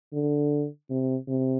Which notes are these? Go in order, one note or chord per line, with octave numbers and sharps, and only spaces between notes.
D3
C3
C3